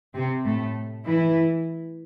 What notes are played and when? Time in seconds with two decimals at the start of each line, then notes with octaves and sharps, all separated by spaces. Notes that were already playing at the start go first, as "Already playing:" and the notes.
0.14 C3 C4
0.45 A2 A3
1.06 E3 E4